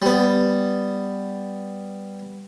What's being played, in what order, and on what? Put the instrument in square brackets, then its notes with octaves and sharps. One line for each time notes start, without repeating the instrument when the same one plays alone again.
[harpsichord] G3 B3